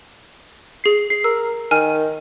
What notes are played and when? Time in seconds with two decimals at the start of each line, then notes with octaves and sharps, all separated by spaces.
0.84 G#4 C7
1.10 C7
1.24 A#4 E6
1.71 D#3 G#5 F6